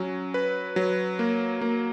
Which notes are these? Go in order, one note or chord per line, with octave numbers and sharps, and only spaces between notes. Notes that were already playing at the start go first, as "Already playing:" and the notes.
Already playing: F#3 C#4
B4
F#3
A#3
A#3